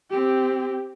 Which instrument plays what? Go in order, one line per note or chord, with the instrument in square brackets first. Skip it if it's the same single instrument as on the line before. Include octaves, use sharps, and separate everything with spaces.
[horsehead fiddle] C4 G4